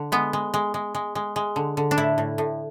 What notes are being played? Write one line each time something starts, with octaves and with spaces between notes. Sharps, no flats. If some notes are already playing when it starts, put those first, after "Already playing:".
Already playing: D3
G#3 B3
G#3
G#3
G#3
G#3
G#3
G#3
D3
D3
D4
A2 E4
A2
A2